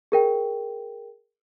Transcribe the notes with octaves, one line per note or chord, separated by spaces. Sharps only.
G#4 A#4 G5